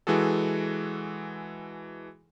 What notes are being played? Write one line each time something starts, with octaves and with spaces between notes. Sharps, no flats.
E3 G#3 F#4 G#4 A4